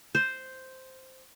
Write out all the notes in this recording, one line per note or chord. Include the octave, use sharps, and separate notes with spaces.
C5